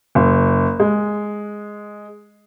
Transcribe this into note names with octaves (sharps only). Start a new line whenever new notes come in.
F#1
G#3